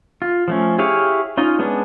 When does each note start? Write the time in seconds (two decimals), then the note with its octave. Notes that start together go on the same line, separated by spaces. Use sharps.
0.22 F4
0.48 F3 A3 C#4
0.79 E4 G4 G#4 C#5 F5
1.37 C#4 D#4 F4 D#5
1.59 G#3 B3 C#4 D4